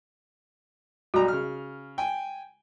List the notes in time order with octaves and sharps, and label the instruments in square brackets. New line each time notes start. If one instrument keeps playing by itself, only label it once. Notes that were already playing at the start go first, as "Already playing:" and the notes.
[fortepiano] B1 G3 A#5 [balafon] F#4
[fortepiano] C#3 F6
G5 G#5